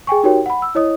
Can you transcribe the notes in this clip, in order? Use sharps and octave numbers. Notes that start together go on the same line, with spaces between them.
G#4 G5 G#5 C#6
D#4 F#4 G4 A#4 C#5 G5
F#5 B5
E6
E4 C#5 D#5 D#6